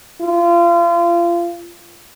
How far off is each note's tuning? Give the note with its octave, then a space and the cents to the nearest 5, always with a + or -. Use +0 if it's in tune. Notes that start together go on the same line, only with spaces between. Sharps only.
F4 -30